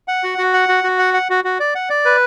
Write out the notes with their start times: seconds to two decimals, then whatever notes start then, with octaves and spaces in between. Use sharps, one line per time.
0.08 F#5
0.23 F#4
0.38 F#4
0.53 F#5
0.69 F#4
0.84 F#4
0.99 F#5
1.14 F#5
1.30 F#4
1.44 F#4
1.60 D5
1.75 F#5
1.90 D5
2.05 B4